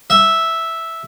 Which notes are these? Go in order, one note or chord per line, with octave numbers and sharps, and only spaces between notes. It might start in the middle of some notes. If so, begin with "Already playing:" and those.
E5